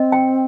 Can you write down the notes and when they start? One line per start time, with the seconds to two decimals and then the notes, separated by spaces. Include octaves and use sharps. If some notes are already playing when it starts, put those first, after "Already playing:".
Already playing: C4 D#5
0.12 G5